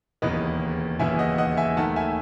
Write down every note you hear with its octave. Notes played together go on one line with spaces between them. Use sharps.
E1 D#2 C#3 E3 B3 B4 D#5
E1 D#2 C#3 E3 B3 E5 G#5
D#5 F#5
D#5 F#5
E5 G#5
D#2 D#3 A3 F#5 A5
E5 G#5